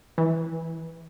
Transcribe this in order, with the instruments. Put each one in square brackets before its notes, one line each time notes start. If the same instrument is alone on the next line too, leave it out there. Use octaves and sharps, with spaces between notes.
[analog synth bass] E3